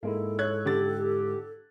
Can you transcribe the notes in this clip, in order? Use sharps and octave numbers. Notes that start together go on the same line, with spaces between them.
G#2 G#3 A#3 E4 A4
C#5 F#6 G#6
D3 G4 A6